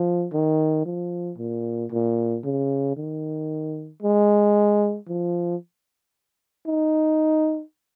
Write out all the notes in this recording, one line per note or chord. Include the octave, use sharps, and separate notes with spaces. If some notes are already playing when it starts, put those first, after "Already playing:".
Already playing: F3
D#3
F3
A#2
A#2
C#3
D#3
G#3
F3
D#4